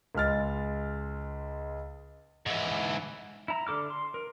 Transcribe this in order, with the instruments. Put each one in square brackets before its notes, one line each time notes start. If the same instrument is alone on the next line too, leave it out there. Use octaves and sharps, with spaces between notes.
[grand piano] C#2 G#3 F6 A6
[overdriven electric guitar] G#2 E3
[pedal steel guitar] E4 A#5
D3 A4 D6 F6
C6
A#4